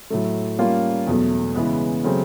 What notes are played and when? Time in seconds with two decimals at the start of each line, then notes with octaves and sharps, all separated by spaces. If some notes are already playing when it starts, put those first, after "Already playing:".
0.10 A2 F#3 A3
0.58 G3 A#3 C#4 F4
1.07 E2 B2 F#3 A3
1.56 C#3 E3 G#3 B3
2.04 C#3 F#3 A3 C4